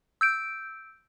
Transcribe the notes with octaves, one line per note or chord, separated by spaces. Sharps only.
E6 G6 D7